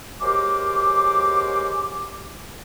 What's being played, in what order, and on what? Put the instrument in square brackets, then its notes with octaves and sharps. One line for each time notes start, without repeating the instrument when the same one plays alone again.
[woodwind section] F#3 G#3 G4 A#4 C5 D6